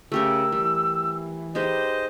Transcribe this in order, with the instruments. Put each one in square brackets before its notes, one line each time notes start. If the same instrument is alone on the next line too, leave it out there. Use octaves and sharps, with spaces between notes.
[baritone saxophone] C#3 [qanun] A3 G4 A#4 [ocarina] E6
[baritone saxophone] E3 [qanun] G3
[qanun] G#3 D#4 G4 [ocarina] B4 [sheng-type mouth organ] C5 D#5